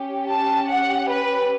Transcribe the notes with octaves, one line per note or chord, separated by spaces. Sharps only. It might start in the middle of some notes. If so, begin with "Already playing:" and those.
Already playing: C#4 G4
A5
F#5
B4